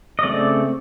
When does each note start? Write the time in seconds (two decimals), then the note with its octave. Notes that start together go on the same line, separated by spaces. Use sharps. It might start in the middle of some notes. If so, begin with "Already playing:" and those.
0.19 D#5
0.23 C#3 F3 A3 C4 D5